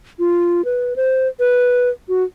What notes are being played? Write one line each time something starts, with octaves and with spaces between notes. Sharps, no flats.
F4
B4
C5
B4
F#4